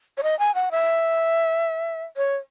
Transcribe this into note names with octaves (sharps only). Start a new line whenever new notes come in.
C#5
D#5
G#5
F#5
E5
C#5